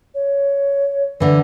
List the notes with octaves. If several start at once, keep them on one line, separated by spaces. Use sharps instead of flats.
C#5
D3 E3